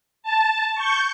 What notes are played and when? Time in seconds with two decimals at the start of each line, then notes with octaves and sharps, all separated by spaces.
0.23 A5
0.74 C#6 G6